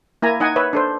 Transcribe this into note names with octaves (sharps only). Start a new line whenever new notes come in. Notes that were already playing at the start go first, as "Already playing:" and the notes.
A#3 E4 G#5 A#5
D#4 D#5 F#5 G#5
B4 C#5 E5
D4 A4 C5